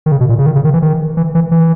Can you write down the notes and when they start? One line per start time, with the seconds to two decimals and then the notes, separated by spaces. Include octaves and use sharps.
0.06 D#3
0.12 C#3
0.21 B2
0.29 A#2
0.39 C#3
0.46 D#3
0.56 C#3
0.65 D#3
0.74 E3
0.82 D#3
1.17 E3
1.35 E3
1.51 E3